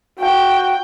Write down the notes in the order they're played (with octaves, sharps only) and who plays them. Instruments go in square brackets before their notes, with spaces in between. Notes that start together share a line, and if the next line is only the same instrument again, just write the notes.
[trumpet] F#4 [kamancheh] G5